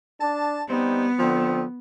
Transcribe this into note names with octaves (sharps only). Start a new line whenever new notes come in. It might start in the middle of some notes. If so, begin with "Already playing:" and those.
D4 A5
G3 B3 C4 D#4
D3 F3 C4